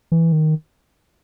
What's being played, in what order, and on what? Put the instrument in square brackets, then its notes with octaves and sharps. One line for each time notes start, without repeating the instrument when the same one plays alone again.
[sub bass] E3
D#3